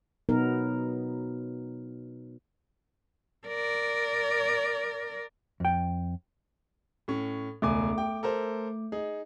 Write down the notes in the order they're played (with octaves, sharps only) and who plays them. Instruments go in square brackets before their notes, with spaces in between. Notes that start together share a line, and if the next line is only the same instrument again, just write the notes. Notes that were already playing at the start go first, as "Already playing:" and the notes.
[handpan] B2 F#3 B3 D#4 A#4
[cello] A#4 D5
[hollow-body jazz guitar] F2 G5
[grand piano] A2 C#4
[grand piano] E1 C#2 G#5 [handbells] A3 D6
[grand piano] G5
A4 A#4 C5
D#4 G#4